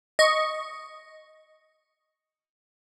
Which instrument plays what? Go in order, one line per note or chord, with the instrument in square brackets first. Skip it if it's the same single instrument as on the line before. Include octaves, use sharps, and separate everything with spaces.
[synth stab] D#5 C#6